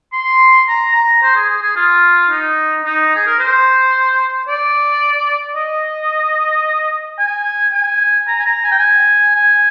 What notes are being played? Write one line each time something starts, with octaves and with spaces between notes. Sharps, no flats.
C6
A#5
A#5
C5
G#4
G#4
G#4
F4
D#4
D#4
G#4
A#4
C5
D5
D#5
G#5
G#5
A#5
G#5
A#5
G#5
G5
G#5
G#5